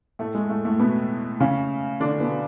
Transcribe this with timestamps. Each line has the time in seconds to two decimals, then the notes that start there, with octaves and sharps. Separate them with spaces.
0.19 A2 A3
0.35 G#3
0.49 A2 A3
0.65 A2 A3
0.80 B2 B3
1.40 C#3 C#4
2.00 D3 D4
2.20 B2 B3